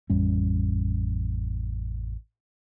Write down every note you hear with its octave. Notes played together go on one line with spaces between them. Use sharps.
A1 F2 G3 C#4